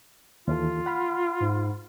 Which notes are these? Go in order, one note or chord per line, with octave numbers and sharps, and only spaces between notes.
D#2 E3 F4 A4
F#5 B5 F6
G#2